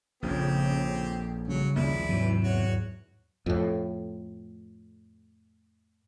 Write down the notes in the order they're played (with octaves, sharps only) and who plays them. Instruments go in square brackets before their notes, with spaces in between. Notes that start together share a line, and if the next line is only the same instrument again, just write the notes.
[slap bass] A#1 F2 [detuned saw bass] C#3 [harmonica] C4 G4
[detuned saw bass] C#3 [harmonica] F#3 [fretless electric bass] G3
[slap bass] A#1 D#2 G#3 [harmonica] E4 D5
[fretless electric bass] D#2 G#2 F#3 [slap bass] C3 [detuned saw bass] E3
[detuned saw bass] E2 [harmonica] F#4 C#5
[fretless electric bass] F2 A2